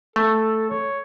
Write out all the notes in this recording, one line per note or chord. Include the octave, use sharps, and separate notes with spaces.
A3 A4
C#5